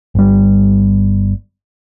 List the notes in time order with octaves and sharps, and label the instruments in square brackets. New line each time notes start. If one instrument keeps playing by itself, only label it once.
[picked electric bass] G1 G3